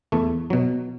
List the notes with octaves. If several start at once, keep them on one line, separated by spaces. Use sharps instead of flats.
E2 A3
B2 F#3